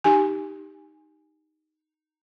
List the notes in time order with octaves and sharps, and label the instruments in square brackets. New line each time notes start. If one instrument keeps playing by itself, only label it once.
[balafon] D#4 G4 G#5